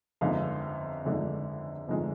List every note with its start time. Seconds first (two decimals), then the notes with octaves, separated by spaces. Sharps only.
0.21 G1 F2 D3 G#3 D#4 F5
1.05 G1 F2 D3 G#3 D#4
1.88 G1 F2 D3 G#3 D#4